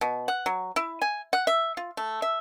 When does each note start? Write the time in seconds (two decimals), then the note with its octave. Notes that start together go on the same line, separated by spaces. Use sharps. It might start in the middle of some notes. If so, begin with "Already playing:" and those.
0.01 B2
0.28 F#5
0.46 F#3
0.76 E4
1.02 G#5
1.33 F#5
1.47 E5
1.77 F4
1.97 A3
2.22 E5